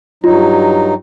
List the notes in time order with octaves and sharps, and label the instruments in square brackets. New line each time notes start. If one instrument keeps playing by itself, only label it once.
[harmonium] G2 F#3 D#4 [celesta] F4